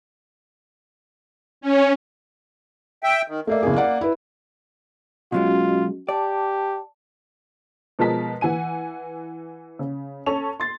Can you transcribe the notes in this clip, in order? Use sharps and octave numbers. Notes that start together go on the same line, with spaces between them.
C#4
E5 G5
D#3
A3 A#3 D5 E5
F#1 E2 G#4
D5 F#5
E4 B4
B2 F#3 G#3 C#4 F4 F#4 D#5
G4 D5 A5
B2 F3 G#3 A#4 A5 B6
E3 F#5 G#5 D#7
C#3
C#4 A4 C#6 F7
C6 A6